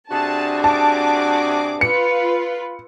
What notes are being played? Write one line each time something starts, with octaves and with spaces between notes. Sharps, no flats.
C3 D4 F#4 G#4 A5
A5 D6
F4 B4 C#7